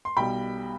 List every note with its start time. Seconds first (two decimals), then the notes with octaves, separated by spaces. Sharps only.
0.05 C6
0.17 B1 B2 G3 G5 B5